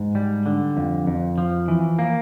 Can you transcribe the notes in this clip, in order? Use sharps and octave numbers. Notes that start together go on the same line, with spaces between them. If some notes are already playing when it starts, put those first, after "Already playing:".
Already playing: G#2
G3
D3
F2
F2
F3
E3
A#3